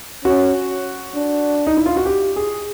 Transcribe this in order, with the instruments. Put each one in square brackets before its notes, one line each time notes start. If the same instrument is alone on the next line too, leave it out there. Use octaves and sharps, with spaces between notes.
[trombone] C#4 [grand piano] F#4
[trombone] D4
[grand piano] D#4
E4
F4
F#4
G4
G#4